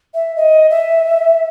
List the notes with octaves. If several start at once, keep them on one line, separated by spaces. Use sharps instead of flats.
E5
D#5
E5